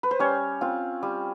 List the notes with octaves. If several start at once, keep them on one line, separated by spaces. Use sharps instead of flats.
B4
C5
G3 C#4 C#5
C4 F4
G3